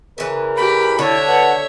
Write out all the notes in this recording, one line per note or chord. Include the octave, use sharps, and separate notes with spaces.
C#3 E3 A#4
G4 B5
D3 E4 C#5 E5
B4 F#5